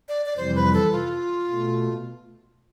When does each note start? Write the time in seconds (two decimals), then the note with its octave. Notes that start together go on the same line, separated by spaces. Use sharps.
0.09 D5
0.26 D5
0.37 F2 C3 E3 G3 C5
0.55 B4
0.74 A4
0.92 F4
1.48 B2 A3